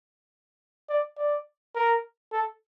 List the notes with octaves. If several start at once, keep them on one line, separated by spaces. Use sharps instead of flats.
D5
D5
A#4
A4